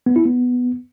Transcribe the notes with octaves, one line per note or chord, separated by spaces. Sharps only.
B3
E4
B3